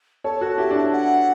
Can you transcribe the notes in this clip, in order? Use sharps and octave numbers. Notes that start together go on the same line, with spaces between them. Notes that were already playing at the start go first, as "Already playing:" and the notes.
A4 C#5 A5
F#4 A4
E4 G4
D4
E4
F#5